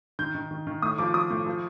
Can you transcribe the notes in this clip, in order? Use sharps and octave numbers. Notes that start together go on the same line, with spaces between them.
D#3 G6
D#3
D#3
D#3
A2 D#6
F3 D6
F3 D#6
A2
F3